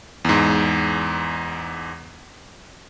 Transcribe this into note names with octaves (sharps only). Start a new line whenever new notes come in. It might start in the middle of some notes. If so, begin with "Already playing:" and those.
E2 G#2